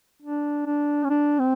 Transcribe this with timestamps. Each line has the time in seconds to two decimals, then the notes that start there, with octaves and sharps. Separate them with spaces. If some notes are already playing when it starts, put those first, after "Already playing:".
0.22 D4
0.66 D4
1.04 C#4
1.10 D4
1.39 C4